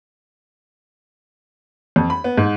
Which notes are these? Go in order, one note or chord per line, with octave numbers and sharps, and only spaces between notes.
F2
B5
B3
G#2